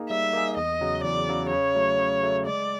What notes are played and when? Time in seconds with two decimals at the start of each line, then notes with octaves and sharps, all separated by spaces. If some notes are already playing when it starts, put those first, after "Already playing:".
Already playing: A#3 D#4 G#4
0.10 G3 E5
0.33 A#3 D#4 G#4
0.57 E2 D#5
0.81 C#3 F#3
1.04 E2 D5
1.28 C#3 F#3
1.51 C#3 C#5
1.75 F#3 A3
1.99 C#3
2.23 F#3 A3
2.46 G#3 D5